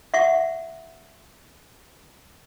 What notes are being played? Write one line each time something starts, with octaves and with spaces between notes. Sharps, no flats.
E5 F#5 C#6